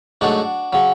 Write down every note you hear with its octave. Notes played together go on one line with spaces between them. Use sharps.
G#2 F#3 A3 D4 F#4
C#3 F#3